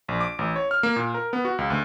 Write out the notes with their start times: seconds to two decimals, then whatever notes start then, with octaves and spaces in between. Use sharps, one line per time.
0.08 A#1
0.21 D6
0.39 A1
0.56 C#5
0.71 F6
0.83 A#3
0.96 A#2
1.14 A#4
1.33 B3
1.45 F#4
1.58 C#2
1.70 D2